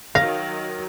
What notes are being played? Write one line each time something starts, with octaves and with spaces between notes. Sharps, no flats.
D#3 F#3 F5 A#6